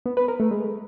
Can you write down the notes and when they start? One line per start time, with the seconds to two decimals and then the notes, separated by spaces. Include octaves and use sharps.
0.06 B3
0.17 B4
0.28 A#4
0.40 A3
0.51 G#3